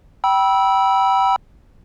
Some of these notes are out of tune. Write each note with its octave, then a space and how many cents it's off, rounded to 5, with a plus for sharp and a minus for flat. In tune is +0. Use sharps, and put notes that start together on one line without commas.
G5 -20 B5 -25 E6 -10